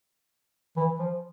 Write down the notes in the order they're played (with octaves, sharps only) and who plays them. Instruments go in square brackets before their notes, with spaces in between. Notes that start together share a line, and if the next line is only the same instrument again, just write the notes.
[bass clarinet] E3
F3